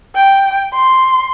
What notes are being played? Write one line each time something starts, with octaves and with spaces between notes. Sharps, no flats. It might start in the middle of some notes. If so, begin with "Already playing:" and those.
G5
C6